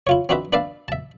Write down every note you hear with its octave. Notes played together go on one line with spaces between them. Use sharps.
E4 F4 C#5
C4 D4 D#4 F#4 B4 E5
D4 B4 D5 E5 F5 A5
E5 A5